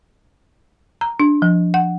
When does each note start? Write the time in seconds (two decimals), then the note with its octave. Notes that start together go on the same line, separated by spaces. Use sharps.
1.01 A#5
1.20 D4
1.42 F3
1.74 F#5